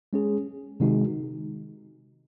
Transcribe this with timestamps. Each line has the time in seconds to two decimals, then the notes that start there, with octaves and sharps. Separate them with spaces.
0.13 G#3 C#4 G#4
0.80 C3 D#3 G#3 D#4 F#4